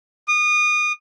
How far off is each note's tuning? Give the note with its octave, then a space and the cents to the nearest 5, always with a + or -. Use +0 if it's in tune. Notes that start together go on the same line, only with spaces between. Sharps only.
D#6 -30